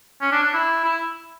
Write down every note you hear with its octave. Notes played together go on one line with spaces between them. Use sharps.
C#4
D4
D4
E4
E4